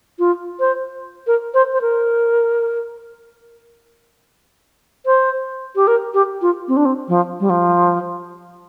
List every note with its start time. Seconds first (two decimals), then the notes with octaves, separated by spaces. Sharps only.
0.19 F4
0.60 C5
1.27 A#4
1.54 C5
1.73 C5
1.81 A#4
5.06 C5
5.76 G4
5.87 A#4
6.14 G4
6.42 F4
6.68 C4
6.77 D4
6.85 C4
7.08 F3
7.40 G3
7.50 F3